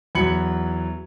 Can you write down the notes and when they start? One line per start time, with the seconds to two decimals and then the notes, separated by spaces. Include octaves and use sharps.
0.15 E2 F#3 B5 G#6 C#7 F#7